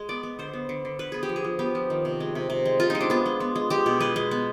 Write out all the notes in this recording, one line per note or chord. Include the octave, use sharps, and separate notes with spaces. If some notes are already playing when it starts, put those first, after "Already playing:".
Already playing: G#3
B3 D5
B3
D3 C5
B3
D3
D3
D3 B4
B3 G#4
G4
F3
G#4
F3
B3 G4
F3
D#3
C3
G#3
C3
C3
G#3
C3 F4
G#3 D#4
D4
B3 F4
G#3
B3
G#3
G#3 G4
B2
G#3 B4
G#3
B3